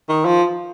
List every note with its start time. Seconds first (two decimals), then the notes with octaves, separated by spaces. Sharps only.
0.09 D#3
0.25 F3